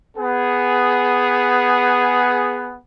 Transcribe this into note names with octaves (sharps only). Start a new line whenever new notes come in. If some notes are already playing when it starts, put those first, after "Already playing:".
B3 G#4